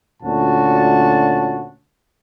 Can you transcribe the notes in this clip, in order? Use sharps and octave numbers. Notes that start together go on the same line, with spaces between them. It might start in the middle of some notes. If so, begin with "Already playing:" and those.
D2 A#2 C#4 F#4 A5